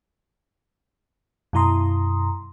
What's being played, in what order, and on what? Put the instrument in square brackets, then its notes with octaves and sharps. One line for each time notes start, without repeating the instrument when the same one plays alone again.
[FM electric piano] F#2 B2 E4 A#5 C6 D#6